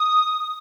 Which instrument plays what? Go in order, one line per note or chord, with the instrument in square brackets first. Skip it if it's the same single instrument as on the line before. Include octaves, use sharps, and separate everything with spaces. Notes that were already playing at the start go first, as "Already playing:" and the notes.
Already playing: [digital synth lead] D#6